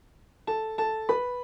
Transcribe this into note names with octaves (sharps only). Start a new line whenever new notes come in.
A4 A5
A4 A5
B4 B5